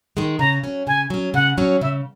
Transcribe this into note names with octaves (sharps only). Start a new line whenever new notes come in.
D#3 G#3
C#3 A#5
F#3 C#4
C#3 G#5
F#3 C#4
C#3 F#5
F#3 C#4
C#3 E5